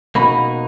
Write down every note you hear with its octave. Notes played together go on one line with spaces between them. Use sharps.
B2 A#3 D#4 F#4 B5